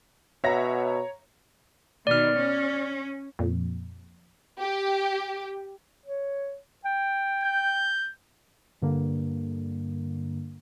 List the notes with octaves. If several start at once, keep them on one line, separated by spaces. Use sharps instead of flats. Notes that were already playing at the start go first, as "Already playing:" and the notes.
B2 C#5 E5 F#5 A#5 A#6
B2 D#3 D5 F6
C#4
F2 A#2
G4
C#5
G5
G6
G2 D3 A#3